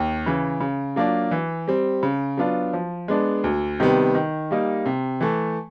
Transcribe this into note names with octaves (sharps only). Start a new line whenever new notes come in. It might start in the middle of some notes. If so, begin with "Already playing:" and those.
Already playing: D#2
C#3 E3
C#3
F#3 A#3 D4 F4
E3
G3 C4
C#3
F#3 B3 D4 F4
F3
G#3 B3 D4
D2
C3 D#3 G3 B3
D#3
G3 A#3 D#4
C3
E3 A3